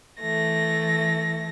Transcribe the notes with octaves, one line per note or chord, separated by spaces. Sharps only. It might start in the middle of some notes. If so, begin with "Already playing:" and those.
E3 A3 A#6